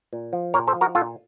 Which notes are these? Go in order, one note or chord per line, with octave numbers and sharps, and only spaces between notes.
A#2
F3
A#2 A#4 C#5
A4 C5
F3
F#4 A#4
A#2 F4 A4